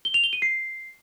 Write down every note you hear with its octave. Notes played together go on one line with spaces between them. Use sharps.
G7
F7
G7
D#7
C7